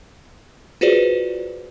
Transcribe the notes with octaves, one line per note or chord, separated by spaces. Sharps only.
F4 F#4 G#4 B4 C5 D5